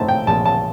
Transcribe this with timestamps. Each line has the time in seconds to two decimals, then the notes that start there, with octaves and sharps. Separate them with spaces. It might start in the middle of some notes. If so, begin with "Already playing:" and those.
Already playing: A#1 A2 A3 C4 D#4 A5
0.08 G5
0.27 A#1 A5
0.45 A5